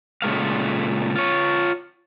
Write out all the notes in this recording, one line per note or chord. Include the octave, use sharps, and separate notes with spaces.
A#2 C#3 E3 G#3 A3 F5
F4 C#5